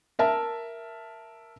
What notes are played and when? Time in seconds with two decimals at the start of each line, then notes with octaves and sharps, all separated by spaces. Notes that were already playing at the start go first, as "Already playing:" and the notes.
0.19 A#4 E5 A5